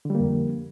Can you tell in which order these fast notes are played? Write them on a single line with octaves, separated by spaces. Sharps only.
D3 G3 A#3 F2